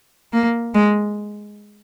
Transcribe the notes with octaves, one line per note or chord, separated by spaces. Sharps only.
A#3
G#3